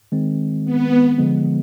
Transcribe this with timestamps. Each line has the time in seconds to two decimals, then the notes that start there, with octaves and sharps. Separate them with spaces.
0.12 D#3 G#3 C4
0.65 B3
1.18 D3 F3 G#3 B3